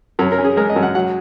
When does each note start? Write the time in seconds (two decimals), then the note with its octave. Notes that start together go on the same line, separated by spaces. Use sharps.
0.19 F#2 C#5
0.32 A#4
0.38 C#4
0.44 G#4
0.57 G#3 A#4
0.70 D#5
0.76 F#2
0.83 F#5
0.95 F#3 F#5